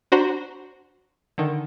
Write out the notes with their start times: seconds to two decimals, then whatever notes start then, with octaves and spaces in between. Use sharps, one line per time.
0.12 D4 F#4 C5 A#5 B5
1.38 D3 D#3